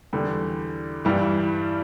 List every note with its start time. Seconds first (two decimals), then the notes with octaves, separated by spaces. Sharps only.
0.13 E2 D3 G3
1.05 G2 E3 G3